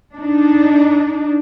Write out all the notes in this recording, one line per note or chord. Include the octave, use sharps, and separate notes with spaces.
D4 D#4